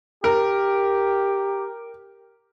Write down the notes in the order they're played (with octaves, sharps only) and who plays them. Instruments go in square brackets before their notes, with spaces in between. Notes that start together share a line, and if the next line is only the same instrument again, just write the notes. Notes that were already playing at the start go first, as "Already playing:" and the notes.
[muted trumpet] G4 [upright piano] A#4